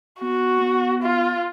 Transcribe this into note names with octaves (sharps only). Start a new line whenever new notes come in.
B3 F#4
B3
F4